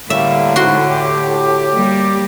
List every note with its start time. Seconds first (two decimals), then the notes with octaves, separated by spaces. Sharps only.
0.10 A2 D3 G3 A3 A#3 E5
0.56 G#2 F#4 C6
0.89 G4
1.73 G3 A#3